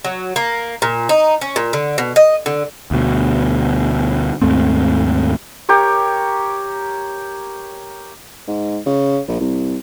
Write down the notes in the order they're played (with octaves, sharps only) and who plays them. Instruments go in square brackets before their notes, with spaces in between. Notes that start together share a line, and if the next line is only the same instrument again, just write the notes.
[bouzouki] F#3
A#3
A#2
D#4
C#4
A#2
D3
B2
D#5
D3
[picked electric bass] D2 B2
D#2 G#2 A3 C4
[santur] G4 A#4 C#5
[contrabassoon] G#2
C#3
A#1
C2